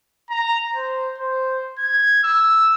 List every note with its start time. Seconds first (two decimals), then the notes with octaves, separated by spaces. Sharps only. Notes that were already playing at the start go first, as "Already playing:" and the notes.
0.30 A#5
0.75 C5
1.18 C5
1.79 G#6
2.23 E6